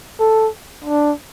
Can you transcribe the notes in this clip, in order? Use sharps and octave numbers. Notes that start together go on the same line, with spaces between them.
A4
D4